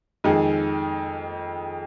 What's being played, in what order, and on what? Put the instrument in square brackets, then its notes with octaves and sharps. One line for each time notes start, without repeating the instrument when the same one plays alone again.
[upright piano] F2 D#3 G#3 D#4 G#4